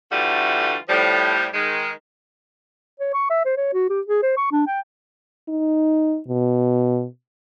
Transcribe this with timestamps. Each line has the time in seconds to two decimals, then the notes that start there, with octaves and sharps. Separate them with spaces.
0.12 D3 E3 G3 A3 F4 F#4
0.89 A2 F3 G3
1.54 D#3 G#3
3.00 C#5
3.14 C#6
3.30 E5
3.45 C5
3.57 C#5
3.73 F#4
3.90 G4
4.07 G#4
4.23 C5
4.37 C#6
4.52 D4
4.67 G5
5.48 D#4
6.28 B2